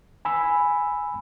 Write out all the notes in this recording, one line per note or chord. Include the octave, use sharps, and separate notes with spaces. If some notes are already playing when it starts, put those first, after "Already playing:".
G#5 B5 E6